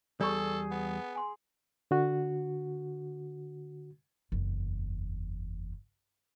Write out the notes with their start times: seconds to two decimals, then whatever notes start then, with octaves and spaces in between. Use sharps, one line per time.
0.21 E2 G3 G#4 A4 D5 B5 C#6
0.71 B3
1.15 G#5 C6
1.91 D3 F#4
4.32 F#1 E2